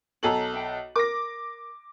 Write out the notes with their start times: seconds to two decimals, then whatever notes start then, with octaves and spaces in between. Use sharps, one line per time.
0.23 B1 A4 C#5 G#5 A#5 F#7
0.54 E5 G5
0.96 A#4 D6 A#6